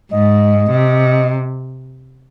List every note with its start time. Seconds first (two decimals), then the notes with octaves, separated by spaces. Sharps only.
0.11 G#2 D#5
0.71 C3